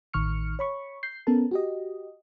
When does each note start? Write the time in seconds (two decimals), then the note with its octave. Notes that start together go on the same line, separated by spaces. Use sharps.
0.13 A1 D#3 C#6 F6 C#7
0.59 C#5 B5 C#6
1.03 G6 C7
1.27 B3 C#4 A4 A#4 A5
1.51 F#4 G4 D#5